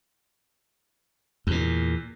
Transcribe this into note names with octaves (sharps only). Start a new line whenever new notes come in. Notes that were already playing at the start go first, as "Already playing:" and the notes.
E2 A#2